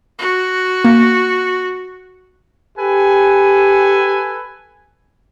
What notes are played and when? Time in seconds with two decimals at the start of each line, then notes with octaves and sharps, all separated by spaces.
0.19 F#4
0.85 A#3
2.78 G4 A4 B4 G#5